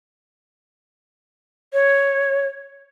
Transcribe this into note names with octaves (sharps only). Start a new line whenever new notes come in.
C#5